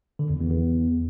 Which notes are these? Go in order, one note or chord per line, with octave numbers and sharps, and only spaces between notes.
D3
E2
E2
E2